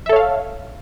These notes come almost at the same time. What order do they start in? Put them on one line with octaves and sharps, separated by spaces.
E5 A4 C#5 F5